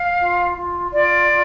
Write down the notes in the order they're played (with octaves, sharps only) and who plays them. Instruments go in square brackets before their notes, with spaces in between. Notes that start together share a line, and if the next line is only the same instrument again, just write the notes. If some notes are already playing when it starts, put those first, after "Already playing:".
Already playing: [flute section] F5
F4
F4
F4 D5